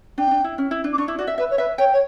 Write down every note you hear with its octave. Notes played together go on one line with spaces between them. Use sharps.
D4 G5
D4
E4
C#4
E4
D4
D6
D4 C#6
E4
F#4 D5
E5
B4 E5
C#5
B4 E5
C#5 G5
C#5